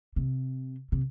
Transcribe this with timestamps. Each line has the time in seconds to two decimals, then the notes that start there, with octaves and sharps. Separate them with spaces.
0.16 C3
0.92 C3